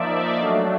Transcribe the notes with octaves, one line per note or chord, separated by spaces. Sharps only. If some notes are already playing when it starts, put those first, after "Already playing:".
Already playing: F3 A#3 D#4 D5 E5
F#3 A3 D4 D#5 F5